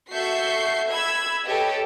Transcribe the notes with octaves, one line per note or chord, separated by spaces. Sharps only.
F#4 A4 E5 C#6 G6 C7
B5 E6 G#6
G4 A4 B4 C#5 D#5